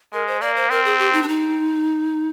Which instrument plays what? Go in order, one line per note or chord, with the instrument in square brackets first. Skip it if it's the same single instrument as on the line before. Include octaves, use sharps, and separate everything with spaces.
[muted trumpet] G#3 [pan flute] A#4
[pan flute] C5
[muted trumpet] A#3 [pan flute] D5
[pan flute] C5
[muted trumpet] C4 [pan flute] A#4
[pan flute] G#4
G4
D#4
D4
D#4